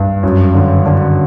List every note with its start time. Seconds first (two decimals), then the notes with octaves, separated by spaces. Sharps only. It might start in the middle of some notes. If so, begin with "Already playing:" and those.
Already playing: G2
0.23 F#2
0.54 D3
0.86 D3